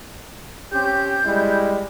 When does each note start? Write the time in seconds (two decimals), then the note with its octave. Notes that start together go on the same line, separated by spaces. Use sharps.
0.72 C4 C#4 G4 G6
1.25 G3 G#3 E4